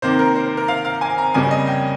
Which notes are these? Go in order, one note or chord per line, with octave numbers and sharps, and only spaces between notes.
C3 D#3 A#3 C5
A#4
C5
C5
A#4
F5
F5
G#5
A#5
F2 C#3 G3 A#3 G#5
D#5
G5